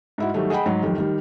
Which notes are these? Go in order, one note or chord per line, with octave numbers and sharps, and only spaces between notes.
G#2 E4 F#4
D#3 F#3 G3 A3
G#4 D#5 F#5 G5 B5
G#2 F#3
F2 D#3 F#3 G3
D#3 G3